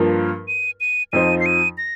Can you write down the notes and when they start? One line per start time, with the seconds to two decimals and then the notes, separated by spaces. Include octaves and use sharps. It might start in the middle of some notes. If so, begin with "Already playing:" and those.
Already playing: G2 F3 A#3 F4 A#4
0.48 D#7
0.80 D#7
1.12 F2 F3 D#4 C5 D#7
1.41 C7
1.46 D#7
1.78 A#6